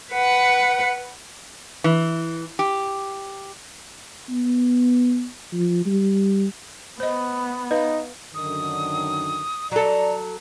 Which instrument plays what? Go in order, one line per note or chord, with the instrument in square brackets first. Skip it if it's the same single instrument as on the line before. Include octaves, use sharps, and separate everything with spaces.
[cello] B4 F#5
[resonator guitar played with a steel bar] E3
G4
[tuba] B3
F3
G3
[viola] B3 [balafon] C5 D#5
[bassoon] D#4 [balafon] B4 F5
[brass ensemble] F#2 D3 D#3 [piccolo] D#6
[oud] F#3 A4 [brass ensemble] D5 [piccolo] A#5